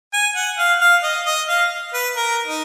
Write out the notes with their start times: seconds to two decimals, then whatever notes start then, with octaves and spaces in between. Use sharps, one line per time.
0.13 G#5
0.36 F#5
0.58 F5
0.81 F5
1.03 D#5
1.26 D#5
1.49 F5
1.94 B4
2.16 A#4
2.46 D#4